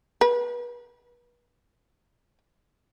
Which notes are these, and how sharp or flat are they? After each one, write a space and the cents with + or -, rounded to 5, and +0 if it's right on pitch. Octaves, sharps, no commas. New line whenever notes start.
B4 -35